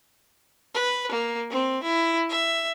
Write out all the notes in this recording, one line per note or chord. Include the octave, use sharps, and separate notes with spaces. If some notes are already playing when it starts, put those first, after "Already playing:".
B4
A#3
C4
E4
E5